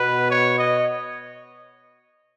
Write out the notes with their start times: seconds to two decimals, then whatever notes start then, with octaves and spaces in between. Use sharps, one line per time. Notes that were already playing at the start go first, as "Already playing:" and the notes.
Already playing: B2 B3 B4
0.31 C#5
0.59 D#5